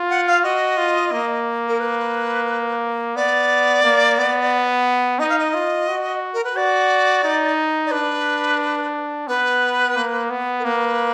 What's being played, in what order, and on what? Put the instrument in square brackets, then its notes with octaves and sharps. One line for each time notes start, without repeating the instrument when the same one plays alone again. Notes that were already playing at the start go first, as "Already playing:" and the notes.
Already playing: [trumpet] F4
[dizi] F#5
F5
[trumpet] F#4 [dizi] D#5
[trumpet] F4
A#3
[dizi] A#4
B4
[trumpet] B3 [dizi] D5
[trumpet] A#3
B3
[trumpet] D#4 [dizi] D#5
[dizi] F5
D#5
[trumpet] F4
F#4
[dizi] A#4
B4
[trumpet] F#4 [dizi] D5
[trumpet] D#4
[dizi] D5
[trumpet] D4 [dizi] B4
[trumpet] B3 [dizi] B4
[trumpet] A#3
B3
[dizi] A#4
[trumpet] A#3 [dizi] B4